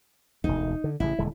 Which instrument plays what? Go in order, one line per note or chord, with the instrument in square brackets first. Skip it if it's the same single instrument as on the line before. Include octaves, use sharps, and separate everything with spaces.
[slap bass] E1 D2 [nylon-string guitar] D#4
[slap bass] D3
[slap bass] A1 C#3 [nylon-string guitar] E4
[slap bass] D#1 D3 G#3